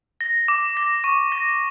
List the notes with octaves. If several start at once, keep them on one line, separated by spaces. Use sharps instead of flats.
A#6
D6
A#6
C#6
A#6